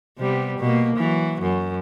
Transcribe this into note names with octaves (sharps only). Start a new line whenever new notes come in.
C3 G3 B3
B2 A#3
E3 F#3
F#2